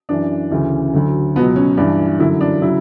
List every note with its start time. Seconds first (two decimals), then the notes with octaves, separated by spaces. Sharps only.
0.09 F#2 E3 D4
0.51 D2 C#3 E3
0.93 D2 D3 F#3
1.36 C#2 B2 F#3 B3
1.56 C#4
1.77 G2 E3 D4
2.19 F#2 D3 F#3 E4
2.41 D4
2.62 C#3 F#3 E4